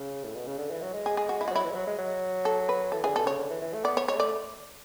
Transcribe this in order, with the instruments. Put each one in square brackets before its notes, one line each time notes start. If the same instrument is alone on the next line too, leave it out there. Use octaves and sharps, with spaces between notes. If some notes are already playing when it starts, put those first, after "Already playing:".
Already playing: [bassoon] C#3
A2
B2
C#3
D3
E3
F#3
G#3
[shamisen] G#4
G#4
F#4
E4
[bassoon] G#3 [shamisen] F#4
[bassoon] F#3 [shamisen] E4
[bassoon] E3
G#3
F#3
G#3
F#3
[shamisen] A4
B4
[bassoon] E3 [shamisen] A4
[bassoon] D3 E3 [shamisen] G#4
[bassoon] B2 [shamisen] A4
[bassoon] C#3 [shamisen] C#5
[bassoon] D3
E3
E3
A3
[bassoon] B3 [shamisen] D5
[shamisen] C#5
[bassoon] G#3 [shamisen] C#5
[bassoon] A3 [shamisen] D5